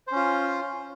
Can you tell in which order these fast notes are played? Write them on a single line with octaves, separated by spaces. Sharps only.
C5 C#4 F4